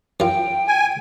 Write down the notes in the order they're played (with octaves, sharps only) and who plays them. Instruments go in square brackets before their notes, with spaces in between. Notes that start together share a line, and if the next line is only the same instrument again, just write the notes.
[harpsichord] F#2 F4 [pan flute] G5
[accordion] G#5